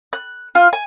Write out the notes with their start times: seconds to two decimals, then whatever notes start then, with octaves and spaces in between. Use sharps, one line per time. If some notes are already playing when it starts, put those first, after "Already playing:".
0.13 F#6
0.55 F4
0.73 G#5